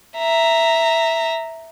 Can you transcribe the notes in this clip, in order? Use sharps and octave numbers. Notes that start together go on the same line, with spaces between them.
E5 A#5